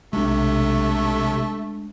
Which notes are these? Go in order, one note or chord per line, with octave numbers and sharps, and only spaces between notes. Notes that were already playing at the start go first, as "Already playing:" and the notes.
B1 C3 G#3 A3 D4